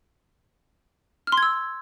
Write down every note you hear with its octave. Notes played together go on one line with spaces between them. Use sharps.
F6
C6
G#6
E6